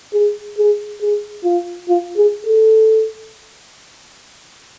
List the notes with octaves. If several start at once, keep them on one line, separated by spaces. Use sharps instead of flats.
G#4
G#4
G#4
F4
F4
G#4
A4